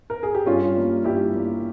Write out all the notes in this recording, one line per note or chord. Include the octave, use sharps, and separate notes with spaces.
A#4
G#4
G4
G2 C#4 F4
G3 A#3
G2 E4 G4
G3 A#3